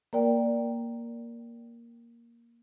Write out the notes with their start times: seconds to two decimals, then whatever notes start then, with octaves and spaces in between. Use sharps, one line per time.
0.13 A#3 A#4 D5 G5